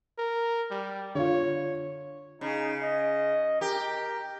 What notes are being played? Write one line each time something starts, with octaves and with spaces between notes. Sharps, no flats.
A#4
G3
D3 F4 C#5
C#3 D#4
D#5
G4 A#4